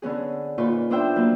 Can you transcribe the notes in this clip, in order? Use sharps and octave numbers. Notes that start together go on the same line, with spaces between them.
D3 B3 C#4 G#4
A#2 D#4 F4 B4 C5 C#6
B3 D4 C5 E5 G5 G6
F#3 A#3 F4 B4